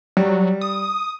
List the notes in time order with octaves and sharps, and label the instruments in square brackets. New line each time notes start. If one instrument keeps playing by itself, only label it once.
[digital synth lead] F#3 [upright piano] G3
[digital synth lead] D#6